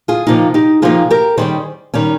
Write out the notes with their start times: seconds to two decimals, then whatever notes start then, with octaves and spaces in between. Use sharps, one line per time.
0.08 F4 G#4
0.27 C3 F3 A#3 D#4 F4
0.54 D#4 G4
0.82 C3 F3 A#3 D#4 F4 G#4
1.10 G4 A#4
1.37 D#3 G3 C#4 G#4 C5
1.94 D#3 G3 C#4